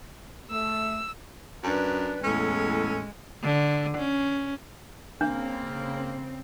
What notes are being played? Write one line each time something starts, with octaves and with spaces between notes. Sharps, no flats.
A3 E6
F#2 D4 B4
E2 A2 G#3 C#4 A4
D3
C#4
C#3 A#3 C4 D4